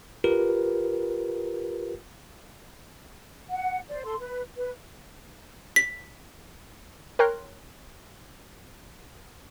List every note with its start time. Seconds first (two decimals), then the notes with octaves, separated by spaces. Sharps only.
0.24 F4 G4 A#4 B4
3.50 F#5
3.89 C5 D5
4.04 A4 C6
4.19 B4
4.56 B4
5.76 B6
7.19 A#4 C#5 G5 C6 F#6